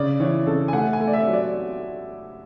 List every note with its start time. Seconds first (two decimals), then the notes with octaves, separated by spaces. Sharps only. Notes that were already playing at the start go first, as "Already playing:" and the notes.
Already playing: C#3 D5
0.20 E3 C#5
0.47 C#3 A4
0.68 G#5
0.73 A3 F#5
0.93 G#5
1.00 A3
1.07 D5
1.13 E5
1.27 F#3
1.33 D5